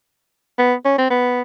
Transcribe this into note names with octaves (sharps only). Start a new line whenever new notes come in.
B3
C#4
C4
B3